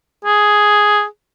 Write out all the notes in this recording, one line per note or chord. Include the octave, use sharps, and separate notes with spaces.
G#4